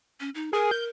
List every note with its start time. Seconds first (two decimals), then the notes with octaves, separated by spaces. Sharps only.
0.20 C#4
0.35 D#4
0.53 G#4 A#4
0.71 G6